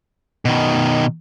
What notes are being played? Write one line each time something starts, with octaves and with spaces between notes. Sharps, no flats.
B2 D#3